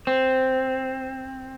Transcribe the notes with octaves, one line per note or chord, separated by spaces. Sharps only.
C4